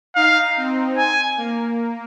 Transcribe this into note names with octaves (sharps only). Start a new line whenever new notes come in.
D#4 F5
C4
G#5
A#3